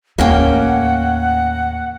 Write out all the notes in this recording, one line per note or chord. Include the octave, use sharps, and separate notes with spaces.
D#2 A2 A#3 C#4 F#5 G5